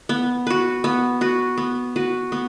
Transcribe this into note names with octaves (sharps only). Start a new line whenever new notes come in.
B3
F#4 B4
B3
F#4 B4
B3
F#4 B4
B3